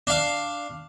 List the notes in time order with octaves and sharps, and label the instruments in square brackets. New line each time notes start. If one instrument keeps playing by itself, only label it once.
[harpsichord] D4 F5